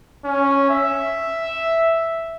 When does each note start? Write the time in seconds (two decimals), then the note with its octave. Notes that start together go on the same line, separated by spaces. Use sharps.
0.25 C#4
0.70 E5